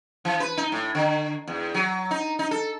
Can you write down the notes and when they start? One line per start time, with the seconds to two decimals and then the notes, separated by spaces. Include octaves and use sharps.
0.25 E3
0.40 B4
0.57 D#4
0.72 A2
0.95 D3
1.47 E2
1.74 F#3
2.11 D#4
2.39 D#4
2.51 A4